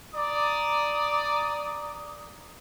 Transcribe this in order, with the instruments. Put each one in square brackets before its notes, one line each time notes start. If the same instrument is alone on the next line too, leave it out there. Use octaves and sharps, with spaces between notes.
[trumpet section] D5 A#5 D6 D#6